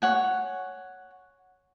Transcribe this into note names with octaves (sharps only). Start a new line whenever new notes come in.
C#5 F#5 G#5